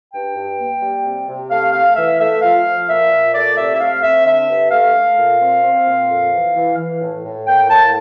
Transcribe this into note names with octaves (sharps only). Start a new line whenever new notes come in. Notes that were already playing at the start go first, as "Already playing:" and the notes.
G2 G5
G2
A#3
G3
C3
C3
A3 F5
A3 F5
E3 E5
A3 E5
F3 F5
F3
A#2 E5
A#2
A3 D5
C3 E5
E5
A3 F5
C4 E5
D3 E5
G2
A3 F5
A3
A#2
C4
C4
A#2
F2
E3
E3
E3
A2
A2
A#3 G5
A2 A5